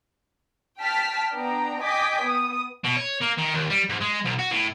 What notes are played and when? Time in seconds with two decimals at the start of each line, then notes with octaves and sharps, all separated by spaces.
0.80 G5 A5 F6 B6
1.33 B3 D4 G5 A#5
1.82 D#5 G5 G#5 D6 G6 B6
2.22 B3 D#6
2.84 B2
2.97 C#5
3.22 A#3
3.38 D#3
3.54 D#2
3.70 G3
3.89 G#2
4.01 G#3
4.24 B1
4.39 F#4
4.51 A2